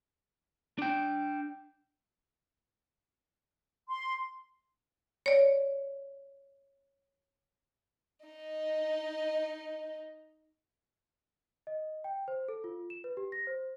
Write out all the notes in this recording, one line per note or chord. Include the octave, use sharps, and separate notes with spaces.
D4 G5
C6
C#5 D5
D#4 D#5
D#5
G5
C5
A4
F4
E7
B4
G4
A#6
C5